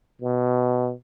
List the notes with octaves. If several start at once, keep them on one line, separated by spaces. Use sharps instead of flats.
B2